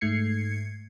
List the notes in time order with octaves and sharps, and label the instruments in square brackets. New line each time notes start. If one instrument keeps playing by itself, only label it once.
[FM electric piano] G#2 A3 G#6 C7 C#7